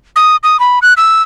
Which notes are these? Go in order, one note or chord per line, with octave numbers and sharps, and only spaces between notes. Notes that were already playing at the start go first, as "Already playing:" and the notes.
D#6
D#6
B5
F#6
E6